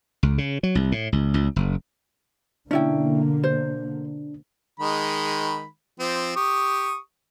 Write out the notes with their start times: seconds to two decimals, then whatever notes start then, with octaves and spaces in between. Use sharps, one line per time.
0.23 C#2
0.38 C#3
0.63 F#3
0.75 C2
0.92 A2
1.12 C#2
1.34 C#2
1.56 F#1
2.71 B2 D3 A#3 C#4 D4 E4 G5
3.44 C5
4.80 D#3 G#3 B5
6.00 F3 C4
6.36 G4 C#6 D#6